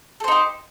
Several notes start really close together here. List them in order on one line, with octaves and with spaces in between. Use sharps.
A4 C5 D#4 G4